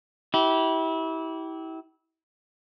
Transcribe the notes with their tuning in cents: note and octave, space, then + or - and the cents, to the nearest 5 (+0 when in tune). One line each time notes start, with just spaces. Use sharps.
E4 -25 G4 -25